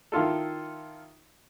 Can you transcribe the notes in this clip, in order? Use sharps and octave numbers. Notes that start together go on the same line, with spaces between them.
D#3 E4 F4 A4